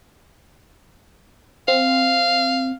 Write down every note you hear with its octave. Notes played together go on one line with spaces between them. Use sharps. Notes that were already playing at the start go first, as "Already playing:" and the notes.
C4 F5